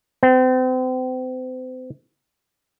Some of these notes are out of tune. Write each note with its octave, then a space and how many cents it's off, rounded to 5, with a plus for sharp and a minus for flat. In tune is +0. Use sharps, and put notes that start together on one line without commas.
C4 -35